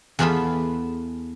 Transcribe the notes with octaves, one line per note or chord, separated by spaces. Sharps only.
E2 E3 B3 F4 A4 B5